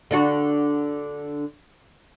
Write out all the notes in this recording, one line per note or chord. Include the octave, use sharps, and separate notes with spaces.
D3 D4 F#4